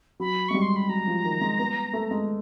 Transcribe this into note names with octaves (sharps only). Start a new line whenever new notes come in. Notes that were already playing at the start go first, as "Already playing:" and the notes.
F#3 B5
G#3 C#6
G3
C6
B5
F#3 A#5
F3
D#3
G#3
B3
A3
G#3